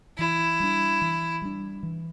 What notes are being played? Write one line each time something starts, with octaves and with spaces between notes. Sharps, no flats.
E3 E4
G3 D4
E3
G3 D4
E3